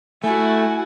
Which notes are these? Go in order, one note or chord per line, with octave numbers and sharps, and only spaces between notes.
A3 E4 F#4 G#5